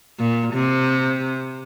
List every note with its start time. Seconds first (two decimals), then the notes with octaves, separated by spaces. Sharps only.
0.20 A#2
0.54 C3